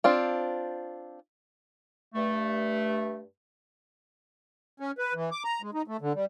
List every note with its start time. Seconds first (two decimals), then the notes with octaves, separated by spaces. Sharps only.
0.04 C4 D4 F4
2.13 G2 A3
4.80 C#4
4.98 B4
5.14 E3
5.31 D6
5.44 A#5
5.62 G#3
5.74 D#4
5.88 A3
6.01 D3
6.14 G3